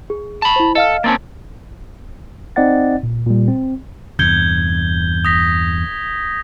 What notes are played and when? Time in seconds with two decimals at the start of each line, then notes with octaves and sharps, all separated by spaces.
0.10 G#4
0.42 A5 B5
0.56 E4 C5
0.75 A4 D#5 F5 F6
1.04 A#3 C4 C#4 A5 A6
2.56 C4 D#4 D5 D#5 F#5 A6
3.03 A#2
3.27 A#2 G3
3.48 C4
4.19 E2 G2 C3 G6 G#6 G7
5.25 D#6 A#6 B6